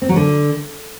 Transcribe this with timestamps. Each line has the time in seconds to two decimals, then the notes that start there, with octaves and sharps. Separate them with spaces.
0.02 C4
0.09 F#3
0.16 D3